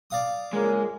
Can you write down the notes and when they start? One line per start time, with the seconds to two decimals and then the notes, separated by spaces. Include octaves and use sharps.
0.10 D5 F5 D#6
0.53 A#1 C#3 G#3 A#3